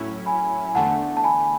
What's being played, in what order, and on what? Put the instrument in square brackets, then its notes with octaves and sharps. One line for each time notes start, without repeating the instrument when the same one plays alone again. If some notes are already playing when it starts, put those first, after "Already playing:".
Already playing: [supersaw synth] A2 F#3 C#4 E4
[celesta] G#5 B5
G#5
[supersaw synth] E2 D3 A3 [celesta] F#5 A5
[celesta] A5
G#5 B5